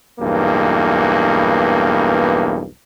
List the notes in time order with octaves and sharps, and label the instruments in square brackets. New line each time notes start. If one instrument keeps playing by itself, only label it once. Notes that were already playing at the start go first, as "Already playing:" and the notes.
[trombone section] B1 E2 G2 A#3